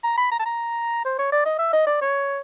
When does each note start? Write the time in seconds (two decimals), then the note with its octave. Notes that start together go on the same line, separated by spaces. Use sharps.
0.04 A#5
0.18 B5
0.31 A#5
0.39 A5
0.45 A#5
1.05 C5
1.18 C#5
1.32 D5
1.45 D#5
1.59 E5
1.73 D#5
1.86 D5
2.01 C#5